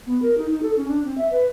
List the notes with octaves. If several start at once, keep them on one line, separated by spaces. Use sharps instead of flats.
B3
A#4
D#4
D#4
A4
C#4
D4
C4
E5
B4